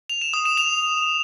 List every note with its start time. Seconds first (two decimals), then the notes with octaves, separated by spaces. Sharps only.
0.10 F7
0.21 E7
0.33 D#6
0.45 E7
0.57 F7